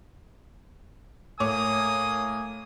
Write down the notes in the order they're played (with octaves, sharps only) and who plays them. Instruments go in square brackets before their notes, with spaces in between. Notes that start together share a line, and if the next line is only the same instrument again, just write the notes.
[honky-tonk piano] A2 C#5 D6 [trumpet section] A#3 G#5 D#6